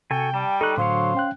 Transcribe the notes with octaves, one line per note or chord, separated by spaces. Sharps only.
C3 F#4 A4 G5 G#5
G3 A5
D#4 A4 C#6 F#6
A2 D3 F#3 C5 C#5 F5
C#4 G5 F#6